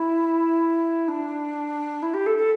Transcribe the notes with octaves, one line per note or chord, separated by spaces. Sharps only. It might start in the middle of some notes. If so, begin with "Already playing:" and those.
Already playing: E4
D4
E4
G4
A4
A4